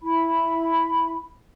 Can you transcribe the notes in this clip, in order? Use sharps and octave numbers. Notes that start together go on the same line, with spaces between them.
E4 B5